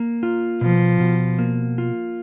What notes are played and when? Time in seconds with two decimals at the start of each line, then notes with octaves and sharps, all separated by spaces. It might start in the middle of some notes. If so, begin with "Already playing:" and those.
Already playing: A#3
0.23 F4
0.61 B2 F3
1.00 B2
1.39 A#3
1.78 F4